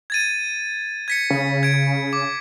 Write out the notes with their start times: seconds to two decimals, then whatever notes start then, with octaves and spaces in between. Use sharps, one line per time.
0.10 G#6 A6 D#7
1.08 G#6 B6 C#7
1.30 C#3
1.63 G#6 D7
2.13 D6